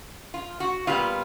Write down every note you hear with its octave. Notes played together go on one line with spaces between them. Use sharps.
F4
F#4
A#2 G3 B3 F4